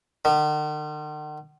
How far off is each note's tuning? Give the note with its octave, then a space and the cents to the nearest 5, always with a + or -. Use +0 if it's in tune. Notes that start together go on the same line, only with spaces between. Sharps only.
D#3 -45